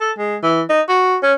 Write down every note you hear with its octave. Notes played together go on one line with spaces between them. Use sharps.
A4
G#3
E3
D#4
F#4
C#4